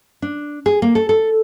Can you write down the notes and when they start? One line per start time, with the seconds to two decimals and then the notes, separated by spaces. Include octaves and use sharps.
0.22 D4
0.66 G#4
0.82 A#3
0.95 A4
1.09 A4